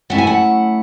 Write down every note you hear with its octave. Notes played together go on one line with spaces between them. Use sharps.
F#3 A3 C#4 E4 F#5
G#5
F#5